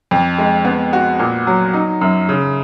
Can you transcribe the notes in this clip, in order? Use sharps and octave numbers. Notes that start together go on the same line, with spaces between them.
F2
G#3
B3
F#4
A#2
F#3
D#4
F#2
C#3